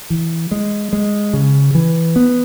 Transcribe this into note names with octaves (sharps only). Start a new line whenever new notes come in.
E3
G#3
G#3
C#3
E3
B3